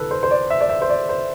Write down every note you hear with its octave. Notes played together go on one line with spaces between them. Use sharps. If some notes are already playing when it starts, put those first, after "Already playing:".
Already playing: D2 C3 E3 A4 B4
C5
C5
D5
E5
D5
E5
C5
D5
C5